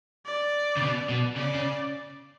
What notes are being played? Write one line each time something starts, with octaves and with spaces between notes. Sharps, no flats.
D5
C#3
B2
B2
C#3 D5
C#3